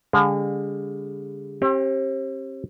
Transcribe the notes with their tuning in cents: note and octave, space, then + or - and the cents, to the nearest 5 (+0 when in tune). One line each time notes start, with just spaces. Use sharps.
D3 -40 G#3 -45
C4 +40 G4 +0